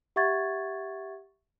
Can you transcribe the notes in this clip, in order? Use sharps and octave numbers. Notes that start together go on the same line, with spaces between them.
G4 E5 F#5 C#6 G#6 A6